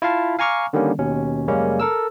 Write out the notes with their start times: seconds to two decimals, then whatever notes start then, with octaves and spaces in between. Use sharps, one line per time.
0.02 E4 F4 E5 F5 A5
0.39 F5 G#5 A#5 C#6 D6 F6
0.73 D3 D#3 G3 A#3 C#4
0.99 D#2 B2 C#4
1.47 F#2 C#3 G3 G#3 A#3 C#4
1.80 A4 A#4 E6